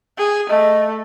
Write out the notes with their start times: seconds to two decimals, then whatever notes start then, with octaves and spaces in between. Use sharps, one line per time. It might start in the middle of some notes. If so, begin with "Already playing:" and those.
0.18 G#4
0.50 A3 D#5